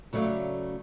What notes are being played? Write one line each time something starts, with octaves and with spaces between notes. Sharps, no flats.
C#3 F#3 A3 C#5 D5 F5